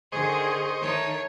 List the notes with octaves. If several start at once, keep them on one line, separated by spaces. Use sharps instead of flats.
D3 D#3 G#4 C5 D#5 C#6
D#3 A3 D#4 C#5